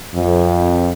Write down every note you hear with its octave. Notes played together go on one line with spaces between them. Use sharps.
F2